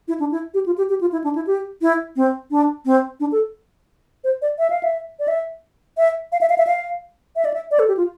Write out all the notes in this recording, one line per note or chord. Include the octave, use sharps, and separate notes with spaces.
E4
D4
E4
G4
F4
G4
G4
F4
E4
D4
E4
G4
E4
C4
D4
C4
D4
A4
C5
D5
E5
F5
E5
D5
E5
E5
F5
E5
F5
E5
F5
E5
D5
E5
D5
A4
G4
F4